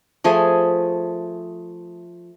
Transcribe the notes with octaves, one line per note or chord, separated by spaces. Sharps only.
F3 A3 G#4